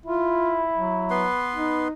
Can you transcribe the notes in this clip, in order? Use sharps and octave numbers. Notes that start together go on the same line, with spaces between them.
E4 F4
F#3
B3 B4 C6
D#4